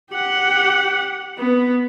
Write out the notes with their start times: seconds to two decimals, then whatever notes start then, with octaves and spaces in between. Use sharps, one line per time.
0.12 G4 F#5
1.38 B3